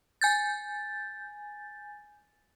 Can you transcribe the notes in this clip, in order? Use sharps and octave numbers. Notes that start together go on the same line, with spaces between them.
G#5 G6 A6